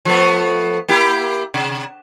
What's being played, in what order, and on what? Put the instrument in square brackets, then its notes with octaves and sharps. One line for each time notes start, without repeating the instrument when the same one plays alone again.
[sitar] F3 A3 B3
A#3 E4 G4
C3